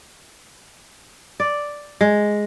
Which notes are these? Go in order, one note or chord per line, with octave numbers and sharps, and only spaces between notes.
D5
G#3